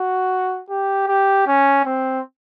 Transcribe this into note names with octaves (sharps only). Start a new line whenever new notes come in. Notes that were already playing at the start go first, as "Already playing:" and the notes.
Already playing: F#4
G4
G4
C#4
C4